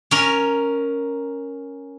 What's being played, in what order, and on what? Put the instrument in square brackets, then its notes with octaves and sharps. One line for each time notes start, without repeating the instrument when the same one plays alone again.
[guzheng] C#4 A#4